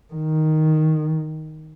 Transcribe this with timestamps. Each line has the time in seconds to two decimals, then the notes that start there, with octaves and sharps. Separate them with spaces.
0.13 D#3